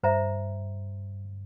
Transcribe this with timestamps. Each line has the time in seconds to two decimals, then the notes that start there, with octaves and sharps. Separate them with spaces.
0.03 G2 C5 E5 A#5